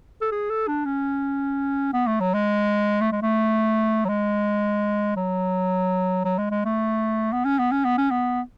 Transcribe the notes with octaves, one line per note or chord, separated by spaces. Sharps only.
A4
G#4
A4
D4
C#4
B3
A3
F#3
G#3
A3
G#3
A3
F#3
G#3
F#3
F#3
G#3
G#3
A3
B3
C#4
B3
C#4
B3
C#4
B3